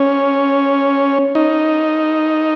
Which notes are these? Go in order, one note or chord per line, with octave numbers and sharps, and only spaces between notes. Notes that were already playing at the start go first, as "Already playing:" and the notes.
Already playing: C#4
D#4